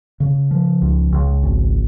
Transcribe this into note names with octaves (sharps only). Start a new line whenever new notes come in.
C#3
F3
C#2
C#2
G#1